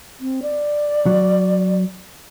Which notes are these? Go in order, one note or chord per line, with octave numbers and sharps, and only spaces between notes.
C4
D5
F#3